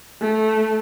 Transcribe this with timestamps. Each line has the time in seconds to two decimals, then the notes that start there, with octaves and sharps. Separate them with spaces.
0.21 A3